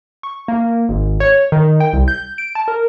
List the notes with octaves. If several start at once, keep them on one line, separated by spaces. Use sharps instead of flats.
C#6
A#3
G#1
C#5
D#3
G5
C2
G6
D7
A5
A#4